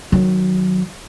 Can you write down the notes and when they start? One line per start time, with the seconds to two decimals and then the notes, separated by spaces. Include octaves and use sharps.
0.12 D#3 F#3